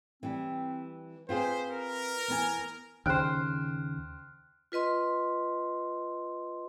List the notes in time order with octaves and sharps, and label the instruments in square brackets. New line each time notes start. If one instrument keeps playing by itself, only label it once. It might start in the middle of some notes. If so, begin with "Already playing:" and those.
[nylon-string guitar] E3 G3 [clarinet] C4
[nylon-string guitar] C4 F4 G#4 [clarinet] B4 [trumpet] C5
[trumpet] A#4
[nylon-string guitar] E2 B3 G#5
[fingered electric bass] D#2 C#3 [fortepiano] C5 G5 [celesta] F6 F#6
[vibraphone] F4 B4 D#5 C6